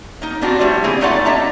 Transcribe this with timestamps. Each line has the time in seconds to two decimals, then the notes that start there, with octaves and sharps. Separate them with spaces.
0.22 A#3 D#4
0.41 B3 C4 D4 F4 F#4
0.59 F3 G3 A3 E4
0.84 C#3 A#3 C4 E4 G#4
1.01 A3 D#4 F4 A4 D5 F#5
1.25 A#3 D4 D#5 E5 A5 A#5